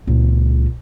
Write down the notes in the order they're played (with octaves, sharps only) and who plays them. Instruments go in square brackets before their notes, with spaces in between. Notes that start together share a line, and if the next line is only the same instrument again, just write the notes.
[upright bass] C#2 A#2